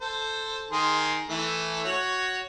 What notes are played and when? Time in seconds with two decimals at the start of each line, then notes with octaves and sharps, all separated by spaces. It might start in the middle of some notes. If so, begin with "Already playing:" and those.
0.01 A4 C5
0.71 D#3 G#4 C6
1.29 E3 A3 A4
1.84 F#4 C#5